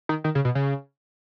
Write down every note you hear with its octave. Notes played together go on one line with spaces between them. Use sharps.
D#3
D#3
C#3
B2
C#3